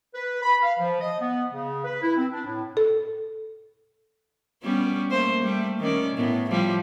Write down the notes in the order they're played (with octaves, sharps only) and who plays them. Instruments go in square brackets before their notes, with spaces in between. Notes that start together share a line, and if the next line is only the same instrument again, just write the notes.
[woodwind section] B4
B5
F5
F3
D#5
B3
C#3
B4
E4
C4
D4
A2
[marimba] A4
[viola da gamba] G3 B3 C#4
A3 A#3 C5
G3 A3
D#3 C#4 D5
A2 B3
A2 F3 G3